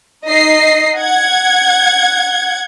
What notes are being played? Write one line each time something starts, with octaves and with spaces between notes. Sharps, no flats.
D#4 D#5 C7
F#5 G#6